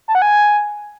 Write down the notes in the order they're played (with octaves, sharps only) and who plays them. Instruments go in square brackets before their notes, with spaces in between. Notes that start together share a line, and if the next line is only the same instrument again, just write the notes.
[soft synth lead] A5
F#5
G#5